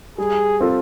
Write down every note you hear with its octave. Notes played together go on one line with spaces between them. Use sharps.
G3 G#4
C4 F4 A4